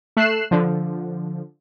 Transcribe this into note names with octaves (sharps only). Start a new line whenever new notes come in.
A3 F#6 C7 E7
D3 F3